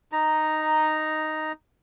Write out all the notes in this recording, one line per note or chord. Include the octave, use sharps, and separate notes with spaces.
D#4 A#5